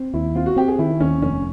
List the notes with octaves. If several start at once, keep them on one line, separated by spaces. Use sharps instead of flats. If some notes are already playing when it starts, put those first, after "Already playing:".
Already playing: C4
D#2 E4
C4 F4
F#4
C4 G4
G#4
D#3 E4
D#2 C#4
F1 C#4